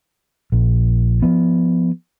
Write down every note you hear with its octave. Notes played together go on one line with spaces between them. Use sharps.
A#1
F3 B3